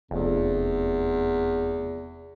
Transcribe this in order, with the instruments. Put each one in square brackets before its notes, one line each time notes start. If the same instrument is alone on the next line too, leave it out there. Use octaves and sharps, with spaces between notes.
[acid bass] F1 [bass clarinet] E2